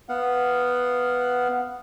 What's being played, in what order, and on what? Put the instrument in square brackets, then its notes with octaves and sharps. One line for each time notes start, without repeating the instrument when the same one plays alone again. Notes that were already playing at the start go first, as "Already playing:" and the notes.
[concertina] B3 F5 F#5